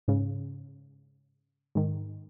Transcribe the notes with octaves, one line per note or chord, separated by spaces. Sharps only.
G#2 C#3
G#2 D#3